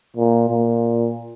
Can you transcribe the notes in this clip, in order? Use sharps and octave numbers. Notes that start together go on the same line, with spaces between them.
A#2
A#2